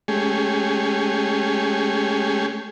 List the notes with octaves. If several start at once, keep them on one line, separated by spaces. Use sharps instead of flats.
G#3 A3 C#4 G4 G#4